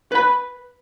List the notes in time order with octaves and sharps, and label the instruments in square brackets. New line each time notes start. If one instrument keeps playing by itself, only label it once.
[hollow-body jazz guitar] B4 B5